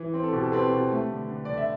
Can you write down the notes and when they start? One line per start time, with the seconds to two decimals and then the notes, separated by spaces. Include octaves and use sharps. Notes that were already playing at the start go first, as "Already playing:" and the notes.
Already playing: E3
0.14 C4
0.23 A4
0.33 B2 G4
0.43 A4
0.52 C4 G4 B4
0.72 B2
0.92 A3
1.11 D3
1.30 D3
1.45 D3 D5
1.57 E5